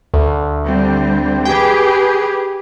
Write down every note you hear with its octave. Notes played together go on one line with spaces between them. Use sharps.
D2
D3 G3 C4
G4 G#4 B4 G5